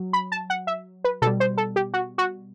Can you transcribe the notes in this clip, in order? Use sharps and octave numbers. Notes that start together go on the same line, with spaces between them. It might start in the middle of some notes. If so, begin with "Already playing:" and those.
Already playing: F#3
B5
A5
F#5
E5
B4
B2 G3 A4
C5
A4
G4
F#4
F#4